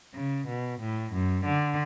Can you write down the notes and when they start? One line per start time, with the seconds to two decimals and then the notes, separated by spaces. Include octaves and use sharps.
0.15 C#3
0.48 B2
0.81 A2
1.13 F#2
1.45 D3